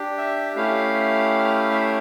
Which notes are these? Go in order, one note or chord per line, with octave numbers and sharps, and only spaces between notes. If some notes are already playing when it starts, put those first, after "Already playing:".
Already playing: D4 G4
E5
A3 C#4 E4 G4 F5
E5